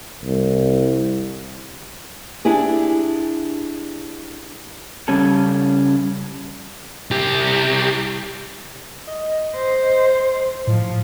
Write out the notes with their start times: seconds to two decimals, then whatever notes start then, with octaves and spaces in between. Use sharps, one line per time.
0.24 C2
2.45 D4 E4 G4 G#4
5.08 C#3 G3 C#4 A4
7.11 C2 G4
9.07 D#5
9.55 C5
10.67 A2 F3